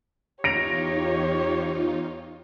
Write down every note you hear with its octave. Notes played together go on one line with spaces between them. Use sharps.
E2 D#4 F4 G4 C#5 A#6 D7 F7